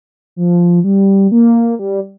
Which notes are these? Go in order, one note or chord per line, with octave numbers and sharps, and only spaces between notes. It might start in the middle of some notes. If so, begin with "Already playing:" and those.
F3
G3
A#3
G3